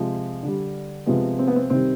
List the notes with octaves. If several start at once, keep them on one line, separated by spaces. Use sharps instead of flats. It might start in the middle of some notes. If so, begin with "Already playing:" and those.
Already playing: C3 F3 G#3
D3 G3
C3 F3 G#3 B3
C4
B3
C4
C3 D#3 G3 C4